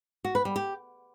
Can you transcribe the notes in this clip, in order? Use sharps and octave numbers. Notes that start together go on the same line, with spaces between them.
F#4
B4
G3
G4